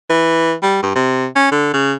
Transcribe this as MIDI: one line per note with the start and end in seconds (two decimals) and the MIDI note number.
0.10 0.54 52
0.63 0.82 55
0.83 0.90 43
0.95 1.27 48
1.36 1.49 61
1.52 1.71 50
1.74 1.94 49